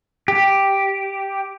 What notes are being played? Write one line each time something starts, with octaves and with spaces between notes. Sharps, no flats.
G4